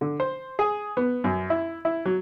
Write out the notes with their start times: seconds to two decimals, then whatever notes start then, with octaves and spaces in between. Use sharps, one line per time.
0.01 D3
0.20 C5
0.59 G#4
0.97 B3
1.24 F#2
1.50 E4
1.85 E4
2.05 F#3